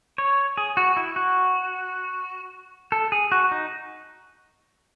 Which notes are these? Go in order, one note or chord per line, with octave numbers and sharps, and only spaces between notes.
C#5
G#4
F#4
E4
F#4
A4
G#4
F#4
D#4